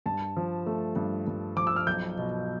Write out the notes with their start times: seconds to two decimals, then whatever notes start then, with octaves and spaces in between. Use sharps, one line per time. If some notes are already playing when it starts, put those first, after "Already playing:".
0.06 G2 A5
0.37 F3
0.66 A3
0.96 G2
1.27 G2
1.56 F3 D6
1.67 E6
1.76 F6
1.87 B1 G6
2.18 B2